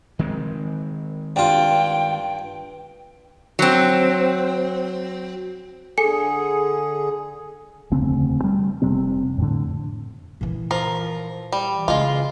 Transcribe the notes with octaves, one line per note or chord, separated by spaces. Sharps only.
D#3 G#3 C4
G2 F4 G5
F#3 C4
D3 G#4 A4 G#5 C#7
E1 D2 C#3 C4
G3
F1 C3 G3 C4
F2 A2 D3
A#2 E3
F3 A#4
G3
C#3 G#3 F4